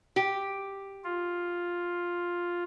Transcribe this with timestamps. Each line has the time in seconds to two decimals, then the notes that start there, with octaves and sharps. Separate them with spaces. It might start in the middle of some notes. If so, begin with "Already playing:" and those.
0.16 G4
1.04 F4